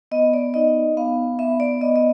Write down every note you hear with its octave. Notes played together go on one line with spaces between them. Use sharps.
B3 D#5
D5
D#4 D#5
B3 F5
B3 E5
D5
B3 D#5
D#5